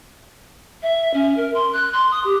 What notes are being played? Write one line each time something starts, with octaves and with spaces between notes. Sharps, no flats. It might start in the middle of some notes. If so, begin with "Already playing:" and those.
E5
C#4
A#4
C6
F#6
C6
D#6
G4